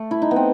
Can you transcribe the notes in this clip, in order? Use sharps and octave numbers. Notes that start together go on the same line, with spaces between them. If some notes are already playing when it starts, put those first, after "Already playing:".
Already playing: A3
E4
D#4
B3
C4